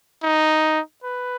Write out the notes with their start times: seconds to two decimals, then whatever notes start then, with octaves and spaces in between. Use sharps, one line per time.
0.23 D#4
1.04 B4